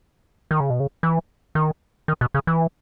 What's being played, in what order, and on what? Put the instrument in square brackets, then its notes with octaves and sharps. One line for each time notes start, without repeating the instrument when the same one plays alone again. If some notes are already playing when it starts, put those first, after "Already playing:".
[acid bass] D#3
C#3
B2
C#3
E3
D#3
D#3
B2
C#3
E3